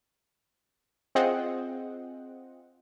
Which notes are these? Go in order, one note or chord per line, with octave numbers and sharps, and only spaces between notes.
C4 F4 G#4 D#5 F#5 G5